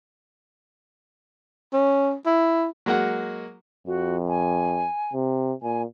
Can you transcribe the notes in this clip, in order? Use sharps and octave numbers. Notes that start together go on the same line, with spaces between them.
C#4
E4
F#3 G#3 A#3 F#4 F#5
F2 F#4
G#5
C3
A#2 G#5